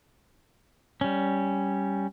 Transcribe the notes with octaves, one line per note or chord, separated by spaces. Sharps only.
G3 C#4